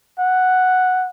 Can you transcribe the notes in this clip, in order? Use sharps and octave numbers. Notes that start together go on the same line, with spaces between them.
F#5